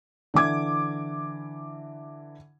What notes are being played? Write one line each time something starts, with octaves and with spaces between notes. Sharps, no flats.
D3 E3 D6 G#6